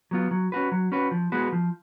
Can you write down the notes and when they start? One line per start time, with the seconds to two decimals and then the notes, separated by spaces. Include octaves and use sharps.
0.11 F#3 B3 F4
0.31 F#3
0.52 C#4 F#4 B4
0.72 F#3
0.92 C#4 F#4 B4
1.11 F3
1.32 G#3 B3 F#4 B4
1.52 F3